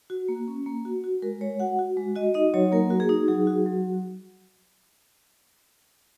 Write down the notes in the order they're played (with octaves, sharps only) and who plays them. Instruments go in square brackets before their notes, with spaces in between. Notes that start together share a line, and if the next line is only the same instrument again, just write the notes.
[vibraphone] F#4
A#3
C#4
A#3
F#4
F#4
G#3 A#4
G#3 C#5
F#4 F#5
F#4
G#3
F#4 D#5
D#4 D#5
F#3 C#5
A#3 A#4
F#4
G#4
D#4
F#3 G#4
F#4
F#3